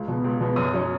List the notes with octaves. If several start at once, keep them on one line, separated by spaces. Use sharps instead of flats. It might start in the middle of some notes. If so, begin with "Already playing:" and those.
Already playing: C#2
B2 B3
C#2
B2 B3
F#2 D#6
F#3 C#4